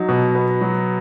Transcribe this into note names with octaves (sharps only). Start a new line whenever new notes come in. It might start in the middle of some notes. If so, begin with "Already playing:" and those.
Already playing: F#3 D#4
B2
B3
F#3